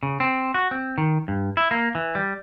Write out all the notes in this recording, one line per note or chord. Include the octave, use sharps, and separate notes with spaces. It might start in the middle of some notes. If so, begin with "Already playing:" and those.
C#3
C4
F#4
C4
D#3
G2
E4
A#3
E3
G3